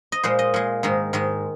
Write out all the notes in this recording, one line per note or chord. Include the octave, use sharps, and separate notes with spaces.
D#5
A#2 G#3 C5
D#5
A#2 G#3
G#2 D#3 G#3
G#2 D#3 G#3